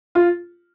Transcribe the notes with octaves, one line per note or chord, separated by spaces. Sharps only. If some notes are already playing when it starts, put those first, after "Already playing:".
F4